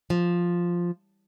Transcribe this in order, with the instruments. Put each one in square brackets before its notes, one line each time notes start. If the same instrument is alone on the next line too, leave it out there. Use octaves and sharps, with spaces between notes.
[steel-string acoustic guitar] F3